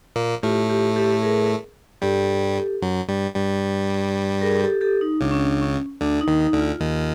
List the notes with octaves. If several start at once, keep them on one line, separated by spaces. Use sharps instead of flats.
A#2 A#3
A2 A3 F4 G4
F4 G4
G4 A4
G#4 A#4
G2 G3 G4 A4
F#2 F#3
G2 G3
G2 G3
G#4 A#4
G4 A4
G4 A4
D#4
C#2 C#3 D4
C#4
D4
C#4
D2 D3 D4
D#4
D#2 D#3
D#4
D2 D3
F4
D#2 D#3